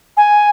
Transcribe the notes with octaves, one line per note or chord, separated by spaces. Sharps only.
G#5